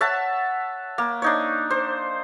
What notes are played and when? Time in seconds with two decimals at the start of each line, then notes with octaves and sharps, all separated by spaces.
0.01 C#5 E5 F#5 A5
0.98 A#3
1.22 D4 D#4 C#5
1.70 C5